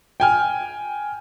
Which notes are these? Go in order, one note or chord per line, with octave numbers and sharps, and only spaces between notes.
G5 G#5 F6